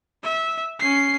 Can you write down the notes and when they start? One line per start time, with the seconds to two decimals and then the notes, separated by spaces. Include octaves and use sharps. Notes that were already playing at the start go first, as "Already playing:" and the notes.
0.23 E5
0.80 C#4 C7